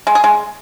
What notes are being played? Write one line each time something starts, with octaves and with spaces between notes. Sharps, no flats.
G#3
G#4
G#3